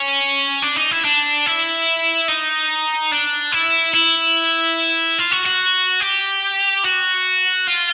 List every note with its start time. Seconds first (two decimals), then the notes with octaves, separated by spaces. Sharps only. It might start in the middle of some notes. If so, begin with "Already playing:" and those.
Already playing: C#4
0.63 D4
0.76 D#4
0.91 E4
1.05 D4
1.46 E4
2.28 D#4
3.12 D4
3.52 E4
3.94 E4
5.19 F4
5.32 F#4
5.46 F#4
6.01 G4
6.85 F#4
7.67 F4